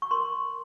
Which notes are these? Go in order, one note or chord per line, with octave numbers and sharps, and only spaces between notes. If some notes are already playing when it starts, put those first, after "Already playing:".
C#6
A#4 C6